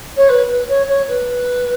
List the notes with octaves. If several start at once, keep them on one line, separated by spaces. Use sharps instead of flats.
C#5
B4
B4
C#5
C#5
B4